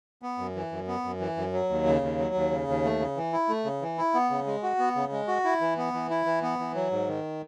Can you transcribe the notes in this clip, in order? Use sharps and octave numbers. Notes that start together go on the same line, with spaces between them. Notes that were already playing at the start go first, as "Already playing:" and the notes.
B3
F#2
E3
F#2
B3
F#2
E3
F#2
F#3
D#2
C#3
D#2
F#3
D#2
C#3
D#2
A3
C#3
E3
E4
A3
C#3
E3
E4
B3
C#3
G#3
F#4
B3
C#3
G#3
F#4
E4
E3
B3
E3
E4
E3
B3
E3
F#3
G#2
D#3